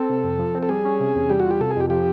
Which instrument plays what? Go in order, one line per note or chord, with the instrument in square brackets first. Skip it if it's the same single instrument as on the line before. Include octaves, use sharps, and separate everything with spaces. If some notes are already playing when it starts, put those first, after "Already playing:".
Already playing: [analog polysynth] C4 [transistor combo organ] A4
[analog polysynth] C3
F2
F3
C4
[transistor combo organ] A4
[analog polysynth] G3 [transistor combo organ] G#4
[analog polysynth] C#4
C3
E2
[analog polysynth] G3 [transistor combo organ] G4
[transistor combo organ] F#4
[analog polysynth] F4
[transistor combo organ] G4
[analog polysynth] C3 [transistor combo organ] A4
[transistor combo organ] G#4
[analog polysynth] F2 [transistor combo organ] G4
[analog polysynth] F3 [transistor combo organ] G4